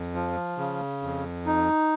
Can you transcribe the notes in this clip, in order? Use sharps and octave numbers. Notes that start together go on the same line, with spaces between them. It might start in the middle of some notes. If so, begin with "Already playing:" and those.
Already playing: F2
F3
C#3
F2
D#4